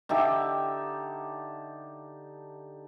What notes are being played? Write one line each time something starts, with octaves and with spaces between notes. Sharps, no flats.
D3 D#4 G4 E5